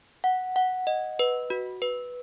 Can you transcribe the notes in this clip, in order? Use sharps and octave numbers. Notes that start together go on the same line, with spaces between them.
F#5
F#5
D#5
B4
F#4
B4